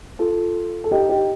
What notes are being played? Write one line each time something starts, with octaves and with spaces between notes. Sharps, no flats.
F4 A4
A4
D#4 G4
D#4 G4